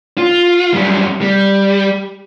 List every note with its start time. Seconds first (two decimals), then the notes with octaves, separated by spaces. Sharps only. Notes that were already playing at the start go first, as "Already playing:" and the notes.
0.18 F4
0.74 F#2 G3
1.21 G3